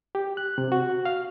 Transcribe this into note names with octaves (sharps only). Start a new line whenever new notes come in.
G4
F#6
C3
F#4
F5